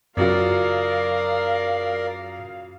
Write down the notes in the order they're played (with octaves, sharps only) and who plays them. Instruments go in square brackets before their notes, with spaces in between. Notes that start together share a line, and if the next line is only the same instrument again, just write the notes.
[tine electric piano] F#2 [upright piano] C#3 F#3 F4 [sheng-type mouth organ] A#4 D5 [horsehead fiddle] F5